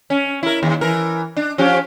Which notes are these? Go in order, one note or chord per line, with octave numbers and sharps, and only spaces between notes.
C#4
E4 A#4
D#2
E3 A#4
D4
F3 C#4 G4